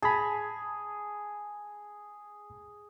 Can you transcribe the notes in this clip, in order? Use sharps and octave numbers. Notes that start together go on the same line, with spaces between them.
G#4 A5 B5